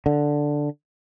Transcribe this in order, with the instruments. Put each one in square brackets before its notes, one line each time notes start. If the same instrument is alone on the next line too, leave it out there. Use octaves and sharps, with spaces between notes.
[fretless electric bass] D3